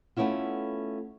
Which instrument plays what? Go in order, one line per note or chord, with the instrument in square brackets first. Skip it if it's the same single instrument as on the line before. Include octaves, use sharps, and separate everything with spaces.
[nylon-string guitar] A3 B3 C#4 E4 F4